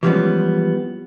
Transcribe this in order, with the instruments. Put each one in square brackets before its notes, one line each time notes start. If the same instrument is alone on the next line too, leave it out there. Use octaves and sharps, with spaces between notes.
[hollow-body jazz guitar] E3 F3 G3 G#3 B3 C#4